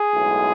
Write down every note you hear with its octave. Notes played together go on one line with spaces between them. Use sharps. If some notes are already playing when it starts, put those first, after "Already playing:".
Already playing: G#4
B1 A2 G#3